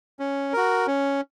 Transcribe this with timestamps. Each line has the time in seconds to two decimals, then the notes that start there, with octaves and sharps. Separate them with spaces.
0.20 C#4
0.53 F#4 A#4
0.87 C#4